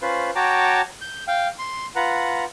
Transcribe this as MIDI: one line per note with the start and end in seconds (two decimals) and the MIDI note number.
0.02 0.30 61
0.02 0.30 65
0.02 0.30 71
0.02 0.30 72
0.35 0.81 66
0.35 0.81 73
0.35 0.81 79
0.35 0.81 81
0.35 0.81 82
0.35 0.81 86
1.01 1.24 91
1.28 1.48 77
1.28 1.48 79
1.59 1.86 84
1.96 2.44 65
1.96 2.44 71
1.96 2.44 78
1.96 2.44 82